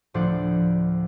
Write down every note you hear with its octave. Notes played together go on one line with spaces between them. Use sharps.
D2 A2 F3 C5 D5 F#5